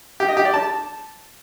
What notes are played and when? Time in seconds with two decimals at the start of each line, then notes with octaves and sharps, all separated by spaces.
0.20 G4
0.28 D#5
0.37 G4
0.45 D5
0.54 A5